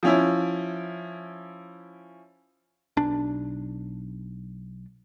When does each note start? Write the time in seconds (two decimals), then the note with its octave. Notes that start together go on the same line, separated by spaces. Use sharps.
0.03 F3 C#4 E4
2.97 B1 D4